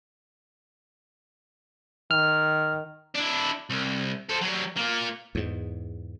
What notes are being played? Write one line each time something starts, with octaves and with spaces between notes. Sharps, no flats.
D#3 F6
D4 E4
C2
A4 C5
F#3 G3
A#3 F4
E2 G#2